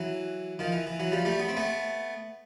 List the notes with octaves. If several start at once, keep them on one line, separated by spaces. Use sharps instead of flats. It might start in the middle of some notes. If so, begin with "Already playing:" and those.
Already playing: E3 F#3
D#3 F3
E3
E3
E3 F#3
F3 G3
G3 A3
B3
C4
A3 B3